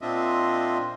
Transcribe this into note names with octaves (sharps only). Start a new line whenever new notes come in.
A#2 C4 D4 F4 D#5 E5